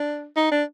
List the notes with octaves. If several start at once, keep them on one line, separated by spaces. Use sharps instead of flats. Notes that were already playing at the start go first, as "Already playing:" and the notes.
Already playing: D4
D#4
D4